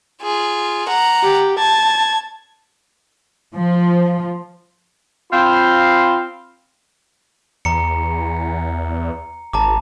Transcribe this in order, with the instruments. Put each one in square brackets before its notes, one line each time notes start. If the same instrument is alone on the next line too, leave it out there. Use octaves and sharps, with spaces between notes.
[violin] F4 G#4
F#5 A#5
[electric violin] G4
[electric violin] A5 [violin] G#6
[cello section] F3
[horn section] C4 F4 C5 F5 B5 C6
[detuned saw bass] E2 [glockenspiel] A#5 C#7
[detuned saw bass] G#1 [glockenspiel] A5 A#5 D6